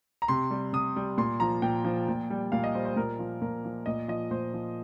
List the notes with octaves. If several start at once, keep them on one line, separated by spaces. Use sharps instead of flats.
A#5
C3 C6
G3
C3 D#6
G3
A#2 C6
F3 A#5
A#2 G5
F3
A#2
G3
A#2 F5
D#5
G3 C5
C5
A#2 A#4
F3
A#2 A#4
F3
A#2 D#5
F3 D#5
A#2 C5
F3